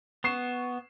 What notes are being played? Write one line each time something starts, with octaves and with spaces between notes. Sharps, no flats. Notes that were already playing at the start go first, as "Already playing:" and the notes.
B3 C#6 C7 E7